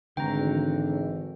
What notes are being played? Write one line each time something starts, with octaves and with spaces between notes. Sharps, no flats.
G#1 D3 E3 A3 G5 A#5